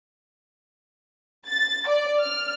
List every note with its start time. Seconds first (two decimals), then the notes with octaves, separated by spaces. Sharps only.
1.47 A6
1.88 D5
2.22 F6